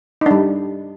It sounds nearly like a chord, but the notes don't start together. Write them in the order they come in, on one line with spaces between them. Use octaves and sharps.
D#4 D4 G3